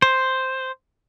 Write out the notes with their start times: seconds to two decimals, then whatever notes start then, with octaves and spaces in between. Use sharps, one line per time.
0.02 C5